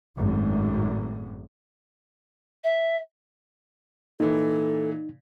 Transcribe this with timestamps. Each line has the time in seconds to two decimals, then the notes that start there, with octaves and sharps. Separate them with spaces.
0.17 G#1 F#2 A2
2.64 E5
4.20 A#2 E3 D#4 A4